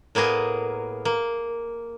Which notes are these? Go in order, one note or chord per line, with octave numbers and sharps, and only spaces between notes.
A2 A#3 B3 G#4 A#4
A#3